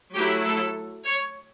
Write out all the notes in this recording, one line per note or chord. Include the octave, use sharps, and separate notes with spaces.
F#3 A3 E4 G4
A4
C#5